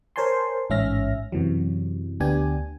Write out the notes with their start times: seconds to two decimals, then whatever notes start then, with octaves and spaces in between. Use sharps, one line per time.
0.16 A#4 C5 C#5 G#5 A5 C6
0.70 A1 G#2 C#4 E5 F6 A#6
1.32 F#2 C3 E3 F#3
2.20 D2 B3 D4 G4 G#5